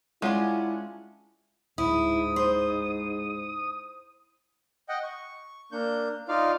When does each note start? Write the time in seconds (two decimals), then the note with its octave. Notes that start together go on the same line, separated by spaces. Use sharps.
0.22 G#3 C#4 D4 E4 F4 F5 F#5 D6
1.78 D1 G#2 E4 D#6
2.36 C5
4.89 D#5 F#5 G5
5.04 C#6
5.72 A#3 D4 G6
6.28 D#4 F4 D5 F5